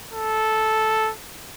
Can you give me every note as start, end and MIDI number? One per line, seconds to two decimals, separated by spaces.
0.13 1.11 69